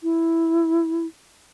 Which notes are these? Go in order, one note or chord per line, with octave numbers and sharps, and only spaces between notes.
E4